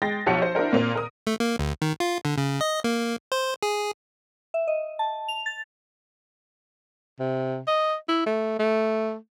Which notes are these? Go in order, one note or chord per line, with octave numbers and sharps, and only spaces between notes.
G#3 G5 A6 A#6
B1 F3 G4 C#5 F#5 C#7
C5
D4 E4 F#4 A#4 C5
A#2 A#3 C4
A#4 D#6
A3
A#3
D2
D#3
F4
D3
C#3
D#5
A#3
C5
G#4
E5
D#5
A5
F7
A6
C3
D#5
E4
A3
A3